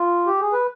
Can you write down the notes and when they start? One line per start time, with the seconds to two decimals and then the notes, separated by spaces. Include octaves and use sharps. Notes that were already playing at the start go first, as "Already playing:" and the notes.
Already playing: F4
0.27 G4
0.40 G#4
0.53 B4